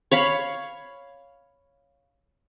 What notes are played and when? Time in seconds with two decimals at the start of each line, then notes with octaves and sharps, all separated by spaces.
0.11 C#5 F5 B5